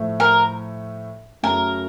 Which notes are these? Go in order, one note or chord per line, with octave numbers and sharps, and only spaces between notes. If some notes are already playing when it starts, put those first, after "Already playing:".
Already playing: A2 F3 A3
A#4
F#2 C#3 F#3 A3 A#4